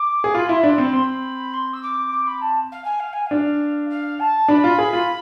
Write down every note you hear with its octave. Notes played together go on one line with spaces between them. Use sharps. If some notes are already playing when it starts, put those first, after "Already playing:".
Already playing: D6
G#4
F4 B5
E4 C6
B5
D4 C6
C4 B5
C4 C6
B5
C6
E6
D6
D6
B5
A5
F5
G#5
F5
G#5
D4 F5
F5
A5
D4 B5
F4
G#4
F4